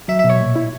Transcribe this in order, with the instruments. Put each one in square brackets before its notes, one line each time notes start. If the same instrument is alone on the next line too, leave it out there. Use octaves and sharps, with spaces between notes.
[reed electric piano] F#3 [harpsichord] E5
[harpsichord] E5
[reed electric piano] B2
[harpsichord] C#5
[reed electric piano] A#2
E4